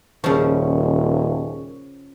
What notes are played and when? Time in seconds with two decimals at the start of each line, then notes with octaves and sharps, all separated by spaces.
0.24 D#1 C#3 F3 G#4 A#4 C#6